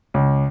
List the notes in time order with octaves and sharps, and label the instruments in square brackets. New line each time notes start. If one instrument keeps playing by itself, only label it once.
[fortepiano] C#2